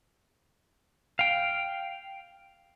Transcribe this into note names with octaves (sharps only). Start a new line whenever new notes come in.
F5 G5